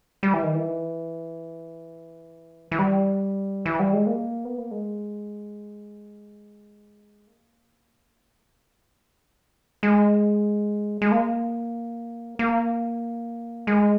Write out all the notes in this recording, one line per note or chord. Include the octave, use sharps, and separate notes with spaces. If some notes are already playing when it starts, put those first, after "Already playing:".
G3
E3
D#3
E3
E3
G3
E3
G3
G#3
A#3
B3
A#3
G#3
A#3
G#3
G#3
A#3
A#3
G#3